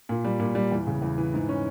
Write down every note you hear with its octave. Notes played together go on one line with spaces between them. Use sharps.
A#2
G3
A#2
G3
E2
C#3
E2
E3
G#2
C#4